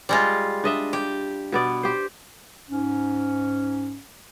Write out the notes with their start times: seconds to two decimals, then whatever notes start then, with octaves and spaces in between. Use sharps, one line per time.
0.09 G3 G#3 F4
0.64 D4 D#5 E5
0.93 G4
1.52 B2 B3 D5
1.83 G4 C5
2.69 G#2 C#4